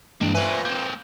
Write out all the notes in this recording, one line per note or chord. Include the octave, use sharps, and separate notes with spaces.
G2 E3 G#3 A#3 D4
F2 A#2 B4 C5 E5 G#5
A#3 C4 G6